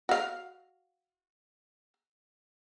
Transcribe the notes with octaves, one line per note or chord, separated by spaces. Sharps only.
F#4 F5